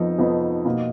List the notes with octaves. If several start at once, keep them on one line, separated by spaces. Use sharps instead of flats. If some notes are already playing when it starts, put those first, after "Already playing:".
Already playing: F2 F3 B3 D#4
F2 F3 B3 D#4
B2 A#3 D#4